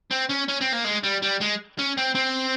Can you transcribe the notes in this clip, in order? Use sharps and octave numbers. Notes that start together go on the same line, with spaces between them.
C4
C#4
C#4
C4
A#3
G#3
G3
G3
G#3
C#4
C4
C4